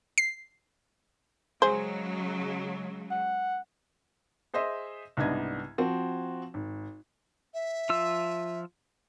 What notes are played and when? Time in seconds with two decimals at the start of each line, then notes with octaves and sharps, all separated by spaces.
0.18 C7
1.62 C#3 F#3 G#3 G#4 C5
3.11 F#5
4.54 G#4 C5 D#5 E5 C6
5.17 C2 G#2 B3 D4 D#5 G#6
5.78 F3 C4 F#4
6.54 G#1
7.54 E5
7.89 F3 F4 E6